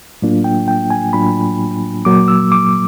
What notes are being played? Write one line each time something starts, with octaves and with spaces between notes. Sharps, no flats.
A2 F#3 A#3 D4 F4
G5
G5
G#5
A2 F#3 A#3 D4 F4 B5
A#2 F#3 A#3 D6
E6
D6